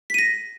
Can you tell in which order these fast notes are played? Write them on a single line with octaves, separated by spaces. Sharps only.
B6 D#7 A#6